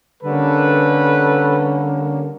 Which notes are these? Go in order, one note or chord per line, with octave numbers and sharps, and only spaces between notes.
D3 G3 A#3 C#4 A4 B4